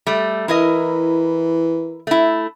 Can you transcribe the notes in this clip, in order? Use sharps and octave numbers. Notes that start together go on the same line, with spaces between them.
G3 A3
E3 E4 A#4 D#5
A3 E4